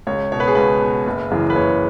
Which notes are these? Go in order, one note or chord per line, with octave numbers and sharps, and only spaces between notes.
C#2 C#5
B2 C#5
B4
G#4
C#2 B4
B2
F#1
F#2 C#3 E3
B4
F#1 C#5